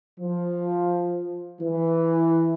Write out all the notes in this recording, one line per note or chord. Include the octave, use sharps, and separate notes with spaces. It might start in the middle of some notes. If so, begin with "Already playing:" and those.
F3
E3